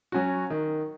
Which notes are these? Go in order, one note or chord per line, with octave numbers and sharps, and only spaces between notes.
F#3 C#4 F#4
D#3